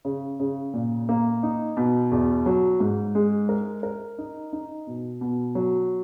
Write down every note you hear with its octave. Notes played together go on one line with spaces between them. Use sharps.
C#3
C#3
A#2
A#3
D#4
B2
E2
F#3
G#2
G#3
A#4
A#4
D#4
D#4
B2
B2
F#3